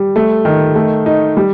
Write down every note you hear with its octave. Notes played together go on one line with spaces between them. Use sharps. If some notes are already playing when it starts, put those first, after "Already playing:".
Already playing: G3
A3
D#3
A3
D#4
G3